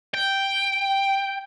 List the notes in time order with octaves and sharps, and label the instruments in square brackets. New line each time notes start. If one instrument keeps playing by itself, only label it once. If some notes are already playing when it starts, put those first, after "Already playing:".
[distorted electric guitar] G5